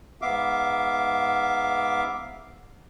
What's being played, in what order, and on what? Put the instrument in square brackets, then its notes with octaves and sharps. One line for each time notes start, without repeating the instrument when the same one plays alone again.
[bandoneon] G#2 B3 E5 F5 D6